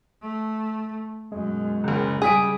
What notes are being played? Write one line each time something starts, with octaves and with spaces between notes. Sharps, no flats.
A3
F#2 B2 G#3
F#1 C#2
C#3 G3 G#4 D#6 B6 D7